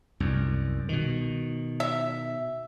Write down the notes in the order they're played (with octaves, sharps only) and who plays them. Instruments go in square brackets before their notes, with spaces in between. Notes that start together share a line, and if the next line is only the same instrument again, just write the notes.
[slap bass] C2 F#2
B2 D#3
[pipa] E5